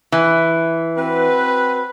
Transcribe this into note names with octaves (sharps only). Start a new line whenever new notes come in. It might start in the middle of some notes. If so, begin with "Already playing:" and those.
E3
C4 F#4 B4